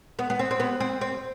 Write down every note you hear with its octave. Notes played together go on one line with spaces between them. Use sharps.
B3
B3
C4
C4
B3
C4
C4